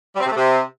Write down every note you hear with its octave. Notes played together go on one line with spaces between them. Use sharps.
G3
C4
C3
A3
C3